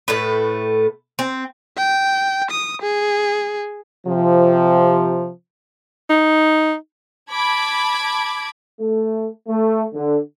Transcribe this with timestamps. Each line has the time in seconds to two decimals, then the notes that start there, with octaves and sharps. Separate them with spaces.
0.08 A2 A3 B4
1.19 C4
1.77 G5
2.50 D#6
2.82 G#4
4.06 C3 F3
6.10 D#4
7.30 A5 B5 D6 G#6
8.80 A3
9.48 A3
9.94 D3